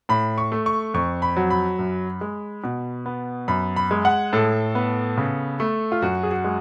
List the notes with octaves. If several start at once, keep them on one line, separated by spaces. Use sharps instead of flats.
A2 B5
C#6
A3
C#6
F2 C#6
B5
F#3
B5
F#2
G#3
B2
B3
F#2 B5
B5
G#3
F#5
A2 A4
B3
C#3
A3
F4
F#2 F#4
G#4
F#4
G#3